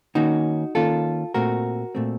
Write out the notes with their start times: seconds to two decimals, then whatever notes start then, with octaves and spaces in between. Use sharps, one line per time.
0.15 D#3 A#3 C#4 D#4 F#4
0.75 D#3 A#3 C#4 F4 A4
1.34 A#2 A3 C4 F#4 A#4
1.95 A#2 A3 C4